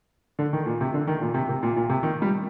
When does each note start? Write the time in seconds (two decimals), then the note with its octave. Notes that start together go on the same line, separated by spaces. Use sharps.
0.39 D3
0.53 D#3
0.66 A#2
0.81 C3
0.94 D3
1.07 D#3
1.21 A#2
1.34 C3
1.49 C3
1.63 A#2
1.76 A#2
1.90 C3
2.03 D#3
2.22 G3